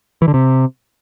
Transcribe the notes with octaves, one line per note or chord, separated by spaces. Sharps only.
E3
D3
C3